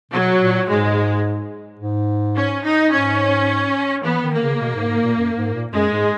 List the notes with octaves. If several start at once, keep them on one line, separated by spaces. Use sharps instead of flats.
B2 F#3
A#2
G#2 G#3
G#2
C#4
D#4
G#2 C#4
E3 B3
D#3
A#3
C#3
B2
G#2
G#2
A#2
F#2
G#2
A#2
F#2 G#3
G#2